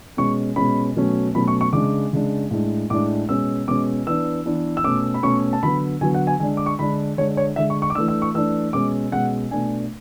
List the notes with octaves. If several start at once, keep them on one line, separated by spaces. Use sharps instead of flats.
B2 G#3 C#4 C#6
B2 G#3 C#4 B5
B2 F#3 A3 C#4
B2 F#3 A3 C#4 B5
C#6
C#6
C#3 G#3 D4 D6
C#3 G#3 D4
A2 G#3 D4
A2 G#3 D4 D6
B2 G#3 C#4 E6
B2 G#3 C#4 D6
E3 B3 D4 E6
E3 B3 D4
E6
B2 A3 C#4 D6
B5
B2 A3 C#4 C#6
A5
D3 F#3 B3 B5
D3 F#3 B3 G#5
F#5
G#5
D3 G#3 D4 G#5
D6
C#6
D3 G#3 D4 B5
D3 G#3 D4 C#5
C#5
D3 G#3 D4 E5
C#6
C#6
D6
E3 A3 D4 E6
E6
C#6
E3 A3 D4 E6
B2 G#3 C#4 D6
B2 G#3 C#4 F#5
B2 A3 D4 G#5